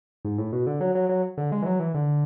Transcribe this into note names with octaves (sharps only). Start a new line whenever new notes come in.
G#2
A2
B2
D3
F#3
F#3
F#3
D3
G#3
E3
F#3
E3
D3